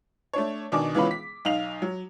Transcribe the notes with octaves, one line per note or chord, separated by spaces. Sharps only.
A3 D4 C#5
B2 D#3 D4 G#5 D6
C#2 E3 B3 C#4 F4 B5
B6
B1 D#4 F5 F7
F#3